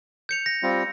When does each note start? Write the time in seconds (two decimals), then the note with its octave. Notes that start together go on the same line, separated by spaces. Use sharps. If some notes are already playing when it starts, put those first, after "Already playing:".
0.29 G6 C#7 F7
0.46 A#6
0.63 G3 C4 F4